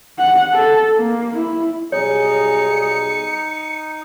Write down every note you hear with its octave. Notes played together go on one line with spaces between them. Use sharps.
F#5
A4
A#3
E4
B1 G3 D#4 G#4 C#5 C#7